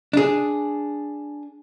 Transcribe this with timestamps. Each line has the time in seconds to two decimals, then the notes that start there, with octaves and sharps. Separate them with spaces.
0.13 D4 G#4